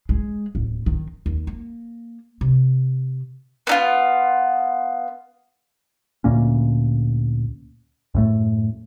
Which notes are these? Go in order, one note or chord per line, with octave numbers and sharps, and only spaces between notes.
G#3
D1
D#3
D#2
A#3
C3
B3 D#4 F4
D2 A#2 A#3 C#4
F#2 A2 A3